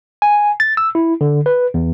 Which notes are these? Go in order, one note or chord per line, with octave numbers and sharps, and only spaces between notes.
G#5
A6
E6
E4
D3
B4
E2